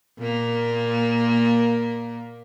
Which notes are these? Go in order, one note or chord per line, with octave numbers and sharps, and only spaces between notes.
A#2 A#3